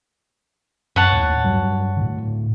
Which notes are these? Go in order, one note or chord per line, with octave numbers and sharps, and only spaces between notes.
F#2 C#5 F#5 A5
D#2 A2
G2 F#3 G3
A2 D3